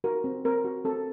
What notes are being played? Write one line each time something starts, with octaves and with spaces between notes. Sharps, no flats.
F#4 A#4
C4
C4 A#4
F#4
C4 A4